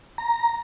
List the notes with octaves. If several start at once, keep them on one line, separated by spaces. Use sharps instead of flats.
A#5